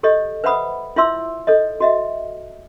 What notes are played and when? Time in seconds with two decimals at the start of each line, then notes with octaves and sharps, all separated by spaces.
0.03 G4 A4 C#5 D#5
0.44 B4 C5 E5 F#5 B5 D#6
0.96 E4 F4 C#5 E5 C6 E6
1.47 A4 C#5 D#5
1.80 F#4 D#5 E5